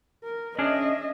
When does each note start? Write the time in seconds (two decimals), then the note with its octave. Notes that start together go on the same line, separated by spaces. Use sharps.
0.24 A#4
0.59 C#4 D4 G#4 D#5 E5